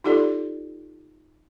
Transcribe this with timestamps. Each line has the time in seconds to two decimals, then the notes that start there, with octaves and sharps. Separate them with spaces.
0.04 D#4 F4 G4 A4 D5